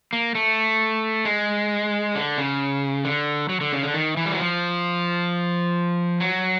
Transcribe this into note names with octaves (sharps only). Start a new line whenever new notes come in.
A#3
A3
G#3
D3
C#3
D3
F#3
D3
C#3
D3
D#3
E3
G3
F#3
F3
F#3